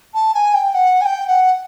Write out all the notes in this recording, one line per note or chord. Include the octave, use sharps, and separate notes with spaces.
A5
G#5
G5
F#5
G#5
G5
F#5